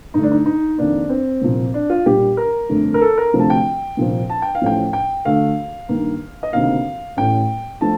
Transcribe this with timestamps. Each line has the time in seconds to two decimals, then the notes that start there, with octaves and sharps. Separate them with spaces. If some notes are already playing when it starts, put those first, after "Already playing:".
0.14 G2 D3 A3 D#4
0.23 D4
0.32 D#4
0.46 D#4
0.78 F2 D#3 A#3 D4
1.09 C4
1.41 C2 A#2 F3
1.74 D4
1.90 F4
2.06 A#1 A#2 G3 G4
2.37 A#4
2.69 G1 F2 D3 A3
2.94 A#4
3.01 A4
3.18 A#4
3.33 D2 C3 F3 A3
3.39 A5
3.50 G5
3.97 C2 A#2 F3
4.29 A5
4.42 G5
4.55 F5
4.62 A1 A2 F3 G5
4.93 G5
5.25 D2 D3 A3 F5
5.89 G2 D#3 A#3
6.43 D#5
6.53 D2 C3 D#3 A#3 F5
7.17 A1 A2 A3 G5
7.81 F3 A3 A5